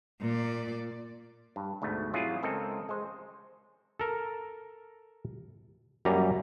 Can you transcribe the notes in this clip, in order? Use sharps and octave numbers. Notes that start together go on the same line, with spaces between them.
A#2 D5
G2
D2 G#2 B2 A3
C3 F#3 E4 F4 G#4
C#2 C4 A4 A#4 D#5 G#5
G#3 C5
A4 A#4
F#2 G3 A#3 A#5